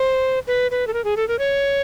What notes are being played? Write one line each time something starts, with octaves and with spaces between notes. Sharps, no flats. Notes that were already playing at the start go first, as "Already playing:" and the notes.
Already playing: C5
B4
B4
A4
A#4
G#4
A4
A#4
C#5